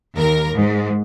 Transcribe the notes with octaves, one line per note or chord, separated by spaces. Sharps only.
D#2 A#4
G#2